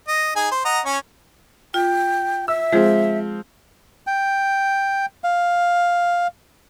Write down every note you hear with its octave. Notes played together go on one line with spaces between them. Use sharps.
D#5
D#4 G#4 G#5
C5
D#5 F#5 A#5
C#4 C#5
F4 G5
E5 E6
F3 G#3 C4 G#4
G5
F5